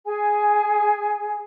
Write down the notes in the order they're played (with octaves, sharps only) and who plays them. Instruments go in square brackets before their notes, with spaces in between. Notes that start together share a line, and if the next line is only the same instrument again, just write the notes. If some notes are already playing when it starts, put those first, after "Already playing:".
[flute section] G#4 G#5